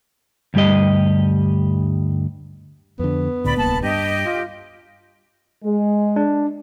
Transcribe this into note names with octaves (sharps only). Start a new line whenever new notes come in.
D2 G2 G3 G4 D#5
F2 D3 B3
C#2 A2 D3 D5 B5
D1 C2 A#3 A5 B5
G2 G4 D#5
F4
G#3
D4